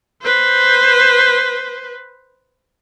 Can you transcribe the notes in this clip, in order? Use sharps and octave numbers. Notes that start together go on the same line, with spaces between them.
B4 C5